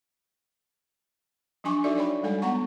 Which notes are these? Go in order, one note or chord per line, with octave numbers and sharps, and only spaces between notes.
F3 F#3 D4 G#5 C#6 D6
D#4 F#4 A4 D5 E5
C#5 D5 G5 B5
G3 G#3 A4 G#5
B3 F#5 A#5 C#6